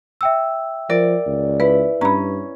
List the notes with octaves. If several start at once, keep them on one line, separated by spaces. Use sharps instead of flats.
E5 G5 E6
F3 A#4 D5
C#2
E4 B4
G2 C#4 A#5 B5